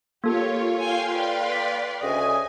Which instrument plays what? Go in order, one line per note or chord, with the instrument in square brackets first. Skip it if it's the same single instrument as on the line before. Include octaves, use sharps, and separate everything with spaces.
[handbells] A#3 A4 [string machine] F4 C#5 [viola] G4
[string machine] F5 G5 C6 [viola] G#5
[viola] B4 D5
[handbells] B6
[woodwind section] D2 C#3 D#5 [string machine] G#5